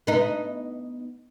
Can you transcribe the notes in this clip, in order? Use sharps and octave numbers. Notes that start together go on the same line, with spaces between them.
B3 D#4